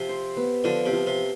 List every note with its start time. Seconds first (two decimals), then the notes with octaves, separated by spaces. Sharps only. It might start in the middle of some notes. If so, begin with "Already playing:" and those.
Already playing: C3 F3
0.09 C5
0.37 B3
0.64 D3 F3
0.85 C3
0.93 F3
1.07 C3